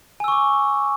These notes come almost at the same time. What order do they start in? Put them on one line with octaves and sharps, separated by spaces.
G#5 E6 C#6 D6